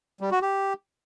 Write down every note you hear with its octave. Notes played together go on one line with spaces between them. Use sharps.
G3
F#4
G4